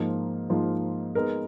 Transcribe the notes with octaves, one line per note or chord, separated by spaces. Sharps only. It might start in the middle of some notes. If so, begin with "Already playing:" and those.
Already playing: G#2 F3 A#3 F4
G#2 F3 A#3 F4
G#3 B3 D#4 A#4